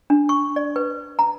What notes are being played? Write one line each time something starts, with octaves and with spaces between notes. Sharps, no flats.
D4
C#6
D5
B4
A#5